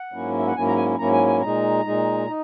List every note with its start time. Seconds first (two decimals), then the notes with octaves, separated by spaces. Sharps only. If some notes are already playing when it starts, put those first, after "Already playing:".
Already playing: F#5
0.13 G#2 F#3 A#3 C#4 E4
0.38 E5
0.47 F#5
0.56 G#2 F#3 A#3 C#4 E4 G#5
0.66 A#5
0.77 G#5
0.99 G#2 F#3 A#3 C#4 E4 A#5
1.13 G#5
1.27 G#5
1.41 A#2 G#3 D#4 A#5
1.84 A#2 G#3 D#4
2.27 D#4